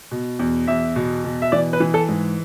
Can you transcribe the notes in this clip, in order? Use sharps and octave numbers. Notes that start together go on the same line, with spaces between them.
B2
E2
E2 E5
B2
B2
E5
E3 D5
B4
E3
A4
G#2